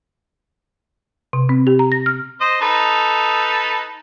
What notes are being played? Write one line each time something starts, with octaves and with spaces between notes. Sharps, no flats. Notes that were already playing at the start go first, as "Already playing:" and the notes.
C3
C4
G4
A#5
A#6
F6
C5 D#5
D#4 A4 B4